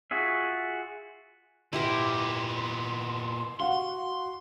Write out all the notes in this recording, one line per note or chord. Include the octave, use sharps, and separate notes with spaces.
F4 F#4 G#4 E5
A#2 B3 E4 G4 A#4 C6
F#4 F5 F#5 C6